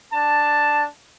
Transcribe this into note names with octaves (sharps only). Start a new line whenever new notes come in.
D4 A5